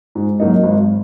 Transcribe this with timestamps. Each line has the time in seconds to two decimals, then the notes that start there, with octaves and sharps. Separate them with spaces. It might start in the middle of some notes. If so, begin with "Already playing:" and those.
0.15 G#2
0.40 F#3 A#3 D#4
0.63 G#1